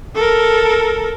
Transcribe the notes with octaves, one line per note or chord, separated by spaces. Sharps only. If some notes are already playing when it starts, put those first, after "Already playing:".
A4 A#4